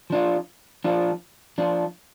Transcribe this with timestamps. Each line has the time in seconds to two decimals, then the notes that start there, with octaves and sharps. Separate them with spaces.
0.10 F3 D4 F4
0.84 F3 D4 F4
1.58 F3 D4 F4